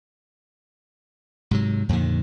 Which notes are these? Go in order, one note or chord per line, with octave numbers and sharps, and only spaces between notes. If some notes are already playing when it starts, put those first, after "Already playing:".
G#2 C3 F#3
F2 A#2 D3 D#3